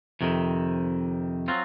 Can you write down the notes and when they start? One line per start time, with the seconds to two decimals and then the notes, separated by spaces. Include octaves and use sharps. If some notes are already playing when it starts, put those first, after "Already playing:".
0.21 F2 C3 D#3
1.48 F#3 C4 F4